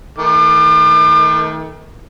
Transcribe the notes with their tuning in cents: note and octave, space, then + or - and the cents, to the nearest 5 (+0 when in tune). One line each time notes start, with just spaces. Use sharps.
D#3 +35 A3 +0 D6 +40